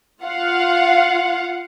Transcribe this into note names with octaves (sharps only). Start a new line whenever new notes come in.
F4 F5 F#5